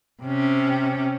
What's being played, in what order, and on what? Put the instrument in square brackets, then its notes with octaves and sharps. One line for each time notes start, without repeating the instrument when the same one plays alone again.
[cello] C3 C#4